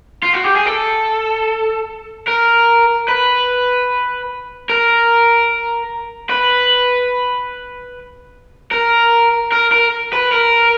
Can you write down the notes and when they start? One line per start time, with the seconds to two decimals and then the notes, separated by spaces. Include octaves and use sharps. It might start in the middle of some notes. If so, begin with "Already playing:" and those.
0.23 F4
0.34 F#4
0.45 G4
0.56 G#4
0.66 A4
2.28 A#4
3.08 B4
4.70 A#4
6.30 B4
8.71 A#4
9.52 A#4
9.72 A#4
10.13 B4
10.32 A#4